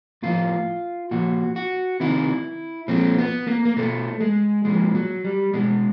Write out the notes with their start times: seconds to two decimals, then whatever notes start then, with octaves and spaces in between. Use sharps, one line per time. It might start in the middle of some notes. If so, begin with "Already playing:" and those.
0.23 A2 F3 F4
1.11 A#2 F3 F#4
1.56 F#4
2.00 C3 D#3 E4
2.88 A#2 F3 C4
3.18 B3
3.47 A#3
3.65 A#3
3.77 B2 A3
4.21 G#3
4.65 A#2 F3 G#3
4.95 F#3
5.25 G3
5.54 B2 G#3